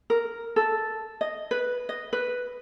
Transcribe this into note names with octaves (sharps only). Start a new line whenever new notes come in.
A#4
A4
D#5
B4
D#5
B4